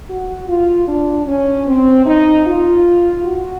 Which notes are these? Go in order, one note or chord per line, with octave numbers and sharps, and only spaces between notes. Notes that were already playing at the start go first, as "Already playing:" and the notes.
F#4
F4
D4
C#4
C4
D#4
F4
F#4